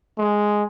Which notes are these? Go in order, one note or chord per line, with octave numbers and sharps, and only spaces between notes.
G#3